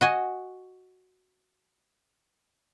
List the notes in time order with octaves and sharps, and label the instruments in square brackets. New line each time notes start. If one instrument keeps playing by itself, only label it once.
[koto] F#4 D#5 G#5